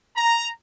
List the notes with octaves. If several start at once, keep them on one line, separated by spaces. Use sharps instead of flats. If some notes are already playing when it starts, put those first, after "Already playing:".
A#5